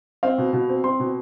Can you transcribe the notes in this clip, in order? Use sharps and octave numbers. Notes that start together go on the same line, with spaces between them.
C4 F5
B2
B2
C4
C4 C6
B2